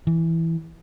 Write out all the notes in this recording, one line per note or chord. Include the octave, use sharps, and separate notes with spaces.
E3